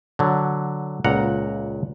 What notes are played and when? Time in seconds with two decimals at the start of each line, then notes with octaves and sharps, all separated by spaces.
0.19 D3 F#3
1.04 C#2 A#2 F#5 A#5